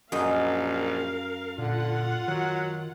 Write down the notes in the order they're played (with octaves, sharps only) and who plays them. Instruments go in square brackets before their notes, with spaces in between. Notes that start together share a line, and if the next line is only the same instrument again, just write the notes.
[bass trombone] A#1 [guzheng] F#2 D#5 [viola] A#4 F5
[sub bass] A#2 [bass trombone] D3 [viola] F4 F#5
[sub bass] D#3 [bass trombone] F#3